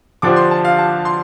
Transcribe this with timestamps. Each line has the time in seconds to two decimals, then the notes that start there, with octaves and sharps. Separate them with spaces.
0.22 D3 F3 D4 G4 C5 D6
0.36 C6
0.51 A5
0.65 F5
0.78 A5
1.05 C6